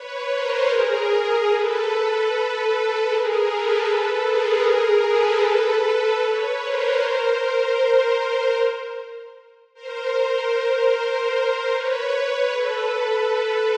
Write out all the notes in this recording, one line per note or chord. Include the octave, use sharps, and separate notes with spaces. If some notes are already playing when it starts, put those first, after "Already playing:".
Already playing: B4 C#5
A#4 C5
G#4 A#4
A4 B4
G#4 A#4
A4 B4
G#4 A#4
G#4 A#4
A4 B4
B4 C#5
A#4 C5
A#4 C5
A#4 C5
B4 C#5
A4 B4